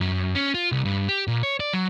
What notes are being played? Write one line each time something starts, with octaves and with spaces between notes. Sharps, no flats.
F#2
C#4
F4
C2
G2
G4
A#2
C#5
D5
F#3